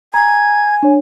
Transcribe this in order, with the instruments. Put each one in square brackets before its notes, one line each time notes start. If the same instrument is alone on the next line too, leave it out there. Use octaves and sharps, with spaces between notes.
[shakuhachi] G#5 [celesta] A#5 [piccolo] G#6
[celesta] D4 C#5